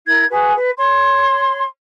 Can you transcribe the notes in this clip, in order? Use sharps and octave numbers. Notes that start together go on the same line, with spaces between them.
E4 A#4 G#6
F#4 G#4 B4
B4
C#5 C6